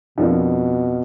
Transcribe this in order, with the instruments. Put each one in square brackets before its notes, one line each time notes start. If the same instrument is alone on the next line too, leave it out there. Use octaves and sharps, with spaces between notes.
[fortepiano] F2 F3 A#3 D4 [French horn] B2